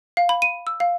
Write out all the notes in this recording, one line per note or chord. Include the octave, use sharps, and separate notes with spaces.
F5
B5
D#7
E6
F5